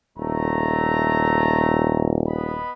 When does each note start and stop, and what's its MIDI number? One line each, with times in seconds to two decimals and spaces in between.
0.18 2.60 27
0.18 2.16 57
0.18 2.16 82
2.27 2.72 59
2.27 2.72 75
2.27 2.72 83